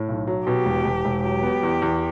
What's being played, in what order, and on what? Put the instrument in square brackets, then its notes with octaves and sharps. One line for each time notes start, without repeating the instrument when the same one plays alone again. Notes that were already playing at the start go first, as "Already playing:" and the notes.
Already playing: [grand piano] A2
B1
F#3
[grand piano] B2 [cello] G4
[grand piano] E1
E1
E1
[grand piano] F#3 [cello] G4
[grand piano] B3
E2
E2